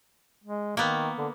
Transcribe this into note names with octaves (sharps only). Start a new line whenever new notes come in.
G#3
D#3 A#3 B3
D3